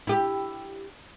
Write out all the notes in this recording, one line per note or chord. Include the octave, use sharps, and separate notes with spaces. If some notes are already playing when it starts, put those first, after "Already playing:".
E4 G4